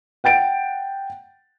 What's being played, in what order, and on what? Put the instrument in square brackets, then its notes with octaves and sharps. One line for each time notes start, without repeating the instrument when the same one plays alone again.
[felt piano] F#5 G5 A6 D7